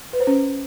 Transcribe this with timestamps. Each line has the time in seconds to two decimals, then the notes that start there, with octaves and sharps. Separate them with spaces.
0.13 B4
0.20 C5
0.27 C#4